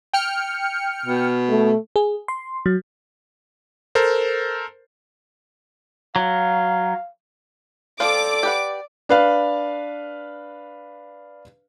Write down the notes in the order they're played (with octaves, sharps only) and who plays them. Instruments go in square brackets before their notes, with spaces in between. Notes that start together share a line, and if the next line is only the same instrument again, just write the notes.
[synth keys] G5 F6 C#7
[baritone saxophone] B2
[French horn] A3
[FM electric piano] G#4
C6
F#3
[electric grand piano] A4 A#4 C5
[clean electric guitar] F#3 [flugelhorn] F5
[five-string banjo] F3 C4 F4 [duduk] A4 [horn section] D5 [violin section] D6
[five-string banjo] G4 B4 F#5
[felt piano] D4 B4 F5